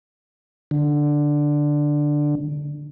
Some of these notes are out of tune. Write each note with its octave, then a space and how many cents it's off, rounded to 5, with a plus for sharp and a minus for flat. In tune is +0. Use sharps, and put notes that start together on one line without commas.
D3 +5